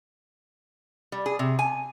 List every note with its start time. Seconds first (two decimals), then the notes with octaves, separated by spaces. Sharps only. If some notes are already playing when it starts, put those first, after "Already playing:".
1.12 G3
1.26 G#4
1.39 C3
1.59 G#5